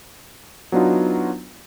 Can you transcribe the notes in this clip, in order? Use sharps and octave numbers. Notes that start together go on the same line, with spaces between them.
F#3 B3 D4 D#4 F4 F#4